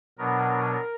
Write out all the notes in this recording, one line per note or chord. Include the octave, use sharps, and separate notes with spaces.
B2 F#3 B3 D4 A#4